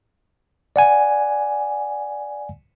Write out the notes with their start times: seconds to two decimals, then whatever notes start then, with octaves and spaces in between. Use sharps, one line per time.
0.76 D5 F#5 G#5